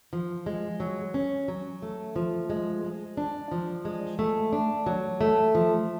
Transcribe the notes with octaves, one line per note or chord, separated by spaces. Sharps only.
F3
G#3
F#3
C#4
F#3
A3
F3
G#3
G#3
D4
F3
G#3
A3
D4
F#3
A3
F3